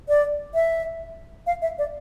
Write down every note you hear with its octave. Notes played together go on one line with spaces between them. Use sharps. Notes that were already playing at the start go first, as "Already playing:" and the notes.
D5
E5
F5
E5
D5